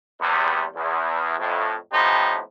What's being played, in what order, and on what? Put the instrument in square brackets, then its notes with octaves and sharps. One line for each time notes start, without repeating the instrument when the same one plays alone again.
[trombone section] E2 C3 G3
E2
F2 A2
A2 F3 B3 C4 D#4 G4